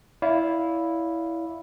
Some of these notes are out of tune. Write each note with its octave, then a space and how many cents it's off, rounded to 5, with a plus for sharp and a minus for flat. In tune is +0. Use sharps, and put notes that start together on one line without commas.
E4 -5 D5 -40 F5 +0